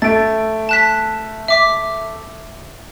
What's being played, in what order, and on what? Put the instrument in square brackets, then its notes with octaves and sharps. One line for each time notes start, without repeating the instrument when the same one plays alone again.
[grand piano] A3 D7 [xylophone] A6
[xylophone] A5 F#6 B6
E5 D6 B6